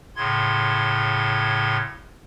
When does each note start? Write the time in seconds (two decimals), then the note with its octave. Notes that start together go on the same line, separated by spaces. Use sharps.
0.16 A2 C#3 C6 G#6